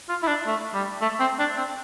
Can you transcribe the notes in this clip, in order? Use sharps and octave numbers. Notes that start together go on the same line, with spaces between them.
F4
E4
D4
A3
G3
A3
C4
D4
C4